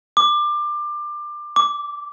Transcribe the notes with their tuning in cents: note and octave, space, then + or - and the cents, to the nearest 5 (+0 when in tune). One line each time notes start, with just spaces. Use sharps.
D6 +25
D6 -10